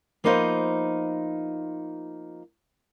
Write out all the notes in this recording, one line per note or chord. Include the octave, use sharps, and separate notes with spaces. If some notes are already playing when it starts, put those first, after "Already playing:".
F3 A#3 B3 D#4 F4 C5